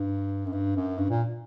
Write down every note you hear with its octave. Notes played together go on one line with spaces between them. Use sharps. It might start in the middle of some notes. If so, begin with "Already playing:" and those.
Already playing: G2
F#2
G2
F#2
G2
A#2